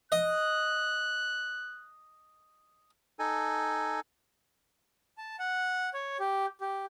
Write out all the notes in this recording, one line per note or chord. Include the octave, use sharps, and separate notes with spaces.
D#5 F#6
D#4 A4 G#5
A5
F#5
C#5
G4
G4